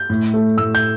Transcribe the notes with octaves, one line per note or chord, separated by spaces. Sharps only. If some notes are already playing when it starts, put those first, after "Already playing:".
Already playing: G6
A2
A3
A2 E6
G6